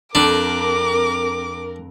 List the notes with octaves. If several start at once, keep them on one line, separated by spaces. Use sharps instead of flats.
F2 D4 A#4 D6